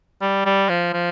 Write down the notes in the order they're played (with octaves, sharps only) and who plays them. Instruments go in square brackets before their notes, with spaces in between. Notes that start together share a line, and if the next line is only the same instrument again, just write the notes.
[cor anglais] G3
G3
F3
F3